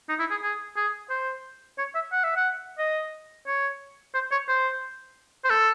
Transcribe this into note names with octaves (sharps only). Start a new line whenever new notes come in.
D#4
E4
G#4
G#4
G#4
C5
C#5
E5
F#5
E5
F#5
D#5
C#5
C5
C#5
C5
C5
A4